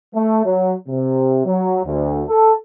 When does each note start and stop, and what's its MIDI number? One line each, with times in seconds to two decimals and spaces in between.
0.14 0.41 57
0.45 0.74 54
0.87 1.41 48
1.45 1.80 54
1.84 2.22 38
2.28 2.52 69